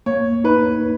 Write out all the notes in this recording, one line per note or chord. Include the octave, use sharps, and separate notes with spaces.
A#3 C#5
D#4 B4